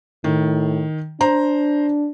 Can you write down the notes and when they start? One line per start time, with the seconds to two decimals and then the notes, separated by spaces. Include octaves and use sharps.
0.24 A2 D#3
1.21 D4 C5 A#5